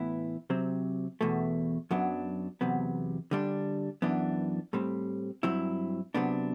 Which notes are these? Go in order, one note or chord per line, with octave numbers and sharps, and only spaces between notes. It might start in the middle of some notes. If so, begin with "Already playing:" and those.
Already playing: A2 E3 B3 E4
C3 F#3 C4
E2 B2 A3
F#2 F#3 B3 D4
E2 C3 F#3 B3
D3 G3 D4
F#2 E3 B3 D4
A2 G3 C4
G2 F#3 C4 E4
C3 F#3 B3 D4